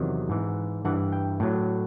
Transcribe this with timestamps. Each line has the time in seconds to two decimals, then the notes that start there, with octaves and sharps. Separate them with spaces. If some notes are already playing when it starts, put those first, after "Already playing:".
Already playing: E2 C3 D#3 F#3
0.29 G#2 E3
0.85 G2 E3 F#5
1.12 G5
1.40 A2 F#3